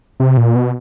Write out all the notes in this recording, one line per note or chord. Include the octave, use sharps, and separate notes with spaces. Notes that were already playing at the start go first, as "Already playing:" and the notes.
C3
A#2
B2